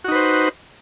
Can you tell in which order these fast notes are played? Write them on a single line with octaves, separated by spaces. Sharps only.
F#4 D#4 B4 C5